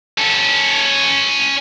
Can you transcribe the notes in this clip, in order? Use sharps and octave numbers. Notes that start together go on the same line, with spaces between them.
C#4 A4